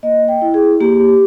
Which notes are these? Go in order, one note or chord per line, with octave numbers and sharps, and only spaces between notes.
A#3 D#5
G5
E4
G#4
A#3 G4